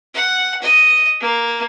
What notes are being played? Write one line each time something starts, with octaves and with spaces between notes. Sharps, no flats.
F#5
D#5
A#3